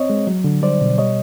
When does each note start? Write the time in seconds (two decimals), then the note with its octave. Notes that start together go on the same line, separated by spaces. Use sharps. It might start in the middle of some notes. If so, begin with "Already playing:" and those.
Already playing: C4 C#5 D#5
0.10 G#3
0.27 F#3
0.44 D3
0.62 G3 C5 D5
0.81 B2
0.98 G3 C#5 D#5